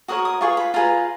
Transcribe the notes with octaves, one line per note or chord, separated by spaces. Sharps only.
F#4 A#4 C#5 D#6
D#6
F4 G#4 B4 C#6
B5
F4 G#4 B4 A#5